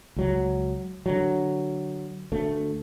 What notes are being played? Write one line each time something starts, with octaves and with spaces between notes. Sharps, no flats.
C#2 F#3
D3 F#3
D2 A3